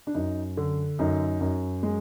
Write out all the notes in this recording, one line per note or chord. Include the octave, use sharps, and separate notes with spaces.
D4
F#2 D#4
D3
F#2 D#4
F#2
G#3